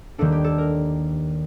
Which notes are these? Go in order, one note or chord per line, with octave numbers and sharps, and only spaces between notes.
D#2 D#3 G3 A#3 D4 A4
G4
A4
A#4